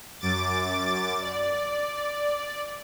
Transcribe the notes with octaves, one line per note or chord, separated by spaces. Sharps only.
F#2 D6 A6
D5